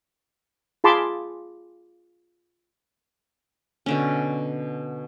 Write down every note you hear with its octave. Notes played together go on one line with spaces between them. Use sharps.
F4 G#4 A5 B5 C6 D6
B2 D3 C#4